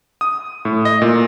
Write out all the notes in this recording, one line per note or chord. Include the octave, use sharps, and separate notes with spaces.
D#6
A2
D#5
A#2